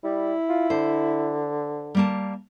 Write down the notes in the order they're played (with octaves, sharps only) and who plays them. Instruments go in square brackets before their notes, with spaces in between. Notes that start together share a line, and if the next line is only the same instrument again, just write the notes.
[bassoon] G3 [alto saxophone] E4
[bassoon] F4
[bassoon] D3 [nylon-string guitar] C5
[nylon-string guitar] G3 A#3 A5